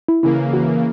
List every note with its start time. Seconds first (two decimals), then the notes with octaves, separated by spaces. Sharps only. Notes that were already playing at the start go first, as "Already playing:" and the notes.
0.08 E4
0.23 C#3 E3 A#3 E4
0.53 F#4